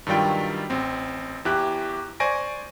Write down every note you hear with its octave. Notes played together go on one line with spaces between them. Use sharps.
G2 D#3 F#3 G3 F4 G5
A1 C4
E2 E4 G4 F#6
C5 D5 G#5 C#6 A#6 D7